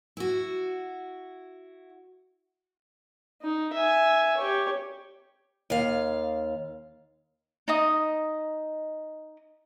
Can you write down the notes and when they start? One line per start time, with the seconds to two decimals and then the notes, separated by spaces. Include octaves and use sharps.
0.17 E4 F#4
3.42 D#4
3.74 E5 G#5
4.37 G4 C#5
5.70 D#2 F5
7.68 D#4 D#5 D#6